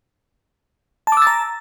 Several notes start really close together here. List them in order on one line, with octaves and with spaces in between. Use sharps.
A5 D6 E6 A6 A#5